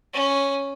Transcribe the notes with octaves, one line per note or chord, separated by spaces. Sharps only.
C#4